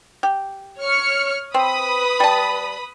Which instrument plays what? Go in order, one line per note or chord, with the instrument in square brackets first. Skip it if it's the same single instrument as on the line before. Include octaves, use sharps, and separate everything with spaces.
[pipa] G4
[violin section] C#5 F6 C#7
[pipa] C4 [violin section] B4 B5 D#6
[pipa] G3 A5